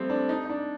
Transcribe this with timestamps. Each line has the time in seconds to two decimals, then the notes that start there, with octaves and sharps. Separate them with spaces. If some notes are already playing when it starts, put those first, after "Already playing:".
Already playing: F3 G3 A3 C4
0.10 D4
0.29 D#4
0.45 D#4
0.49 D4